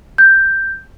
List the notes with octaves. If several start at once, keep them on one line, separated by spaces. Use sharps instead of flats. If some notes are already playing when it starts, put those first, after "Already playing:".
G6